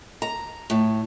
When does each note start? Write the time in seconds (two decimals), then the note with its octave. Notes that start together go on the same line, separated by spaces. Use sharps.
0.22 A#5
0.70 A2